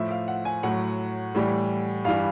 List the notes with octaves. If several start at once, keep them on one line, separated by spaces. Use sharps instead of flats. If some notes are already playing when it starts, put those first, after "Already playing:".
Already playing: A2 F3 E5
F5
F#5
G#5
A2 F#3 F#5
A2 E3 G3
G2 E3 G3 F5